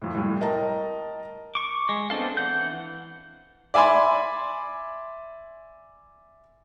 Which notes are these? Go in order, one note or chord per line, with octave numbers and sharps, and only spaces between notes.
F2 A2
C2 A2
A#4 D#5 G5 A5 A#5
C#6 D6
G#3
B3 C4 D4 A4 F5
E3 F#5 G6
D5 E5 G#5 B5 C6